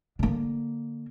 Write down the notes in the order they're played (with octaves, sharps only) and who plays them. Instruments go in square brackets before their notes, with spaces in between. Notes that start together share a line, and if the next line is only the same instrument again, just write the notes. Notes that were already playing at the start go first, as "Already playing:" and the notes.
[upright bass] D3 A#3